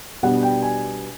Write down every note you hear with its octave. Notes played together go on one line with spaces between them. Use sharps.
B2 G3 B3 D4 F#5
G5
G#5